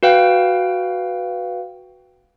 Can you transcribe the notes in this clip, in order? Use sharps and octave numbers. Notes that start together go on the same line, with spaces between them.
F#4 B4 F5 G5